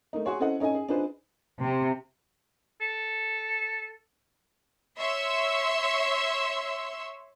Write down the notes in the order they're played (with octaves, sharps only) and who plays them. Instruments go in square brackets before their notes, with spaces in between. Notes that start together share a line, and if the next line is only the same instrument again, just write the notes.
[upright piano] A3 A#3 D#4
F#4 G#4 C#5 C6
C#4 E4 A4 C5 D#5 F#5
C#4 D#4 A4 D#5 G#5
G#4
D4 D#4 F4 G#4 B4 C5
[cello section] C3
[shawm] A4
[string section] C#5 E5 C6 C#6 E6